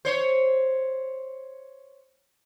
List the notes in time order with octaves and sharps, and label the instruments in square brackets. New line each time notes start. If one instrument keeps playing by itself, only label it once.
[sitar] C5 C#5